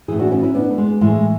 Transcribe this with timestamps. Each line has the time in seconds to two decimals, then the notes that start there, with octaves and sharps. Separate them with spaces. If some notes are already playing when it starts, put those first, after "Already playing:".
0.08 A2 E3 E4 G#4
0.19 D4 F#4
0.31 C#4 E4
0.43 C#4 E4
0.54 B3 D4
0.70 A3
0.78 G#3
1.01 A2 E3 G#3